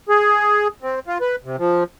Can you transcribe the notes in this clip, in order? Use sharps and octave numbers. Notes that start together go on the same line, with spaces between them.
G#4
C4
F4
B4
C3
F3